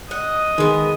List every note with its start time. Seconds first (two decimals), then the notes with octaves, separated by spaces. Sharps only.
0.11 D#5 F#5
0.58 D#3 G#3 B3